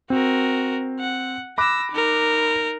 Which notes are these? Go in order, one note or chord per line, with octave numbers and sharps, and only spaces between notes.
C4 F#4 A#4
F#5
B5 D6 E6 F#6 A#6
D#4 A#4